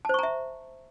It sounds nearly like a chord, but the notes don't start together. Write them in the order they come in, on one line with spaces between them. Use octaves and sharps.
A5 C5 C#6 A#5 E5